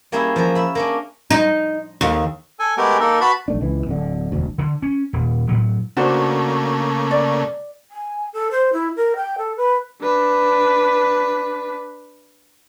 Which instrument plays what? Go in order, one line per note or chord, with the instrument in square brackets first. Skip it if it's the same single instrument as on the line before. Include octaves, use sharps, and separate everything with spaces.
[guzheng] G3 A#3 C#4 E4 G#4 E5
F3 C#4 A#4
E5 B5
A#3 C#4 D4
[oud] D#4
D#2
[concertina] A4 G#5
G#3 A3 B3 G4 A#4
A#3 D#4 A4 A#4
F#4 B4 A5 B5
[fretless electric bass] A#1 A3 D4
C#2 E3
D1 D3
E1 D2
[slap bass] D3
C#4
D#1
A2 F#3
[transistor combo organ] C#3 A3 A#3 [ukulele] D4 F#4 C5
[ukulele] D5
[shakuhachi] G#5
A4
C5
E4
A#4
G5
A4
B4
[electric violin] D4 B4